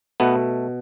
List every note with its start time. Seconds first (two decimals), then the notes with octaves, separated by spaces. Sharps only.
0.20 B2 A3 B3